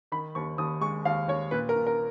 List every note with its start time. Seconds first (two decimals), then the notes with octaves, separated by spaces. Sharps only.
0.12 D#3 B5
0.35 D#2 C#6
0.58 D#2 D#6
0.81 G#3 C#6
1.05 D#2 F5
1.28 D#2 C#5
1.51 A#2 B4
1.69 A#4
1.76 A#2
1.87 A#4